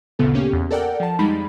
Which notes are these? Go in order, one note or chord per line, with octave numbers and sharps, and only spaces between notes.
G#1 D2 A#2 C#3 B3 A4
A#3 C#4 G4
E2
A4 A#4 D5 F#5 G5
F3 A5
F2 G3 G#3 D#4 B5